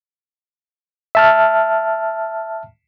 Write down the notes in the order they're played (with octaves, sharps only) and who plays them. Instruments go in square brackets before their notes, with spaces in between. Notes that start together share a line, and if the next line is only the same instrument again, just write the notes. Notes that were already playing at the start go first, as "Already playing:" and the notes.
[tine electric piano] E5 A5 F6